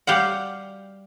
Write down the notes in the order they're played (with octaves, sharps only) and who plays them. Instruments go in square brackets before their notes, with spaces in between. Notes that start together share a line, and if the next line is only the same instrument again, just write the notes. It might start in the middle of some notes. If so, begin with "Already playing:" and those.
[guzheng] G3 G4 F5 F#5